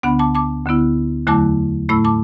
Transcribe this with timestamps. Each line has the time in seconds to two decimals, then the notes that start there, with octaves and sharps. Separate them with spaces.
0.03 D2 D3 B3 D4 F#5 B5
0.19 A5 D6
0.35 A5 D6
0.65 D2 D3 B3 E4
1.27 E2 D3 F#3 A3 E4 A5 D6
1.89 A2 A3 E4 B5 E6
2.05 A5 D6